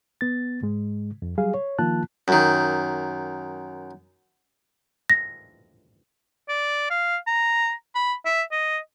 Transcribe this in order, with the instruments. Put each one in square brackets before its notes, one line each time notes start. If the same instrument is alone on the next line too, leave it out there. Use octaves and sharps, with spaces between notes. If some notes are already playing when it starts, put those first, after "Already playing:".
[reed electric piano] B3 A6
G#2 G#3
F2
F#3 G3 G#4 F5
C#5
D#3 F3 A#3 F4 A5 F#6
[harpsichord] F#2 D#3
[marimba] A#6
[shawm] D5
F5
A#5
B5
E5
D#5